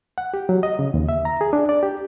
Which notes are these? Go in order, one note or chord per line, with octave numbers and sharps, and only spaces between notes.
F#5
G4
F#3
D#5
C#3
D#2
E5
A#5
G#4
D4
D5
G4